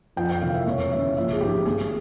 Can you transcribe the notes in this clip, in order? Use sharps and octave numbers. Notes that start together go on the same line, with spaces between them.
F2 G5
G5
C3 E3 A#3 F5
E5
E1 C#5
E2 C#3 E5
A#1 E5
G#4
G#2 F3 G4
G#1 G#4